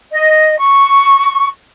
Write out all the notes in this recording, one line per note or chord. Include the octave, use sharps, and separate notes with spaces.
D#5
C#6